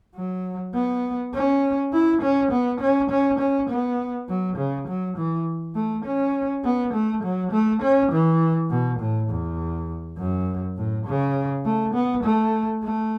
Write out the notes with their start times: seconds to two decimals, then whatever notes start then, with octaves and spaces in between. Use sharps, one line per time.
0.15 F#3
0.74 B3
1.34 C#4
1.93 E4
2.22 C#4
2.51 B3
2.80 C#4
3.10 C#4
3.39 C#4
3.70 B3
4.29 F#3
4.57 C#3
4.88 F#3
5.17 E3
5.75 A3
6.05 C#4
6.64 B3
6.93 A3
7.23 F#3
7.52 A3
7.82 C#4
8.12 E3
8.70 B2
9.00 A2
9.30 E2
10.18 F#2
10.77 A2
11.06 C#3
11.65 A3
11.94 B3
12.24 A3
12.83 A3